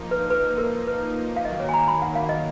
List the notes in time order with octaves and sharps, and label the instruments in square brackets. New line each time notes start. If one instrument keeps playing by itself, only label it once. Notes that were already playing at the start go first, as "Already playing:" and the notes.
Already playing: [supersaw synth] F3 A#3 D#4
[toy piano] B4
B4
A#4
B4
F5
[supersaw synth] D#3 F#3 A#3 [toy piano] D#5
[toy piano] C#5
G#5
A#5
B5
F#5
F5
D#5